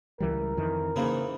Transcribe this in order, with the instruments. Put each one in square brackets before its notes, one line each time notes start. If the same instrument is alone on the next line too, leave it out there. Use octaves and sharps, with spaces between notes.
[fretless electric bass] C#2 E3 G3 [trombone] A#4
[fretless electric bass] F2 D#3 E3
[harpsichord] G#2 E3 A#3 [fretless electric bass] C#3